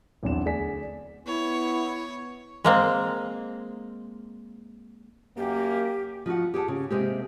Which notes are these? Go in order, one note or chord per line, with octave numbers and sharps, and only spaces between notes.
B1 E2 C4 D4 E7
D2 G#4 D5 G#5 B6
B3 E4 C#5
G#3 A#3 C4
F#2 A#3 G4
F3 D#4 F#4 F#5
G4 G#4 F#5 A5
C#3
C3 G#3 A#3 C4 G4